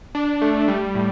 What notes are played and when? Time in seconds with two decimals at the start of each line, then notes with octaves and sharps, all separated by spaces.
0.15 D4
0.42 A3
0.68 G3
0.95 A2